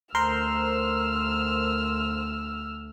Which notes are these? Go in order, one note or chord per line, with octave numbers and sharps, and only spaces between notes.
D2 A#4 C5 C6 E6 F6